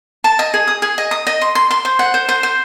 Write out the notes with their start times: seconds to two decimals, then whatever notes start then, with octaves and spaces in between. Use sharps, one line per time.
0.24 A5
0.39 D#5
0.54 G#4
0.68 D#6
0.82 G#4
0.98 D#5
1.11 D#6
1.27 D#5
1.41 C6
1.55 C6
1.71 C6
1.85 C5
1.99 F#5
2.14 C5
2.29 C5
2.43 C5